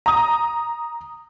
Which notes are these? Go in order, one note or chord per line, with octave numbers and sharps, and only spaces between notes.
A#5 D#6